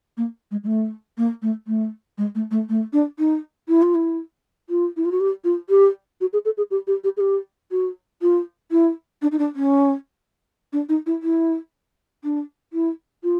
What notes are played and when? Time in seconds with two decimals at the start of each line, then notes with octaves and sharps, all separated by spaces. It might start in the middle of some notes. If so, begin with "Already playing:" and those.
0.17 A#3
0.51 G#3
0.64 G#3
0.67 A3
1.18 A#3
1.42 A3
1.67 A3
2.18 G#3
2.35 A3
2.51 A3
2.69 A3
2.93 D4
3.19 D#4
3.68 E4
3.82 F4
3.95 E4
4.70 F4
4.97 E4
5.05 F4
5.12 F#4
5.20 G4
5.44 F4
5.69 G4
6.21 F#4
6.33 G#4
6.45 A4
6.57 G#4
6.71 G4
6.87 G4
7.04 G4
7.17 G#4
7.20 G4
7.72 F#4
8.22 F4
8.71 E4
9.22 D4
9.32 D#4
9.39 D4
9.55 C#4
10.73 D4
10.89 D#4
11.06 E4
11.23 E4
12.24 D4
12.73 E4
13.24 F4